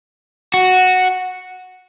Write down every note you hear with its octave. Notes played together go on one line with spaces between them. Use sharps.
F#4